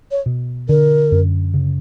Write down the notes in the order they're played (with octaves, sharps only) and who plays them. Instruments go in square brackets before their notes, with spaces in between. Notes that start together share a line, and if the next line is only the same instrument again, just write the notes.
[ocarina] C#5
[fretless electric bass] B2
[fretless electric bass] D3 [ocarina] A#4
[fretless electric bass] F#2
C#3